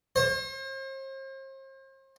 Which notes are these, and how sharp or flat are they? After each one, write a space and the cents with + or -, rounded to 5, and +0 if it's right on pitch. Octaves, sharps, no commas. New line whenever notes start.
C5 +40